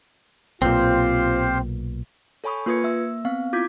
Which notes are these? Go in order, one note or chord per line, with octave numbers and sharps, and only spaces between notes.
B1 A#2 C4 F4 G4 C5 F5
A4 C#5 G#5 B5 C#6 D#6
A#3 F4 B4 D#6 G#6 C#7
A#3 E5 E6
B3 C4 F5
E4 F4 D6 G6 G#6 B6